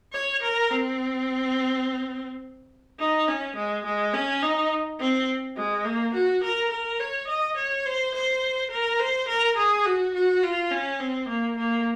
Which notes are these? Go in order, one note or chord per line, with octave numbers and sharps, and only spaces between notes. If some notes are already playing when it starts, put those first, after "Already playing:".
C#5
A#4
C4
D#4
C#4
G#3
G#3
C#4
D#4
C4
G#3
A#3
F#4
A#4
A#4
C#5
D#5
C#5
C5
C5
A#4
C5
A#4
G#4
F#4
F#4
F4
C#4
C4
A#3
A#3